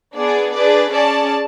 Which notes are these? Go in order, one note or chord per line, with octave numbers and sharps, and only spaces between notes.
B3 D4 G#4 D5
D4 G#4 B4 D5
C#4 G#4 D5 A5